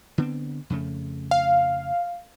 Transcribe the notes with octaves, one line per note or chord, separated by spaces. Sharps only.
D3 B3 C4
F2 C#3 A3
F5